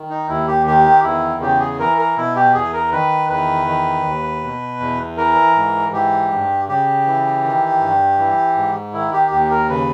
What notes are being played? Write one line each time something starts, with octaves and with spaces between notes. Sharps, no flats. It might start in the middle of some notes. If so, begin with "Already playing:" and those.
Already playing: D#3
D#4
D#2 E4
G4
D#3 G4
E2 E4
C#3 G4
G#4
E3 A#4
A#4
B2 E4
G4
E2 G#4
A#4
D#3 B4
E2 B4
D#3
D#2
B2
E2
E3 A#4
G#2
E3 G4
G2
C#3 G4
E3
D#3
G2
E3
G#2
D#3 E4
G4
D#2 G4
A#4
C#3 B4